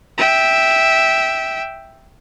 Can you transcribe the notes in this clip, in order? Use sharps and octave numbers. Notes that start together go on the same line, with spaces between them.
E5 G5